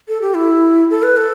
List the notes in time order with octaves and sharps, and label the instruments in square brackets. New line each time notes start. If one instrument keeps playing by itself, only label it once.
[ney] A4
G4
E4
A4
B4
A4